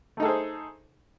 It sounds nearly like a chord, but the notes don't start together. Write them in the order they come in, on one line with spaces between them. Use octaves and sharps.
A3 D#4 A4 G#4 C5